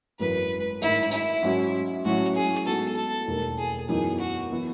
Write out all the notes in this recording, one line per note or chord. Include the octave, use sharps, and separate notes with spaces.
G#1 F#2 E3 G#3 B4
A1 G#2 D#3 G#3 E4
E4
G#2 F#3 C#4 F#4
A1 A2 F#3 C#4 F#4
G#4
A2 G#3 B3 D#4 F#4 A4
A4
E1 D#2 D#3
G#4
F#2 E3 B3 D#4 G#4
F#4
E3 B3 E4